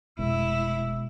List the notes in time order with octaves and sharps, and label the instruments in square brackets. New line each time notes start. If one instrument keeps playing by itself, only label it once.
[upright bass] F1 [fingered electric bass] B2 G#3 [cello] E4 [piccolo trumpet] E6